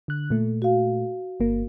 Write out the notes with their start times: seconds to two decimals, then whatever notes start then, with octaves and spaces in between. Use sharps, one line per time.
0.08 D3 F#6
0.30 A#2 A3
0.62 F#4 F5
1.40 G1 A#3